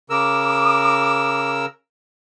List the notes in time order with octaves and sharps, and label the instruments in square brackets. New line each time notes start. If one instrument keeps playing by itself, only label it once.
[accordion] C#3 A#4 E6 [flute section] D6